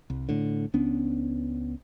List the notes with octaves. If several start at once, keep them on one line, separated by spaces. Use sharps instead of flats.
C2
A2 D3
C#2 B3 C#4 D4